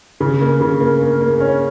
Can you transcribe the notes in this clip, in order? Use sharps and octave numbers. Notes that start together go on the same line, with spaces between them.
C#3
A#3
C#3
A#3
A#3
A#3
C#4